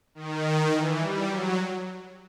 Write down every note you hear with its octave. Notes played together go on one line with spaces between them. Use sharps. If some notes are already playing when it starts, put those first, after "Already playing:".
D#3
E3
G3
F#3